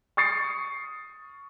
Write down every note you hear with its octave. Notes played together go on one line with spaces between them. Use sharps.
C#6 D#6 A6 C7 C#7